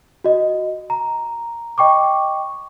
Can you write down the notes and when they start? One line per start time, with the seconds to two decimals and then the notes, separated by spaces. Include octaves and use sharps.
0.24 F#4 D#5
0.90 A#5
1.78 D#5 G5 C#6 D6